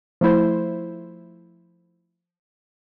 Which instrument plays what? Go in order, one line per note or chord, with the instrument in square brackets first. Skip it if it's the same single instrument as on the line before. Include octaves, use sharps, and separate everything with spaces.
[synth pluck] F3 A3 E4 C5